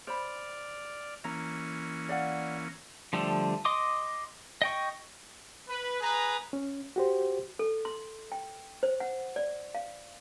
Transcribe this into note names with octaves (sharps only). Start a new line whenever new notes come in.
C5 D5 B5 F6
E3 A#3 C#4 A#5
D5 F5 F#5
D3 F3 G3 A3 A4
D#5 C6 D6 D#6
D#5 G5 C#6
B4
G#4 B4 A#5
C#4
F#4 G4 C5
A4
C6
G5
C5
F#5
D5
F5